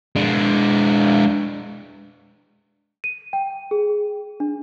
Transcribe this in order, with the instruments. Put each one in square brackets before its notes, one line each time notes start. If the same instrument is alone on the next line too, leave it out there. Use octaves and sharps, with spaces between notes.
[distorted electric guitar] G#3 D4
[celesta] D#7
G5
G#4
D4